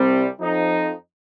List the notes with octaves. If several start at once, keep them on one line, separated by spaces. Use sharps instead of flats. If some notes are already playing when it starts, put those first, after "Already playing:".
Already playing: C2 C3 G3 C4
F2 F3 D#4